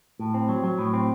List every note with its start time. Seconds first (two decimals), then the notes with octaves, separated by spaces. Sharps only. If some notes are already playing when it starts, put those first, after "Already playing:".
0.20 A2
0.34 C4
0.49 F#3
0.64 F#3
0.79 A2
0.93 C4